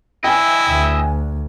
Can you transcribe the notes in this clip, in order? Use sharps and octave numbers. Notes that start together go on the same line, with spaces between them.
E4 D#5 E5 G5 G#5
D2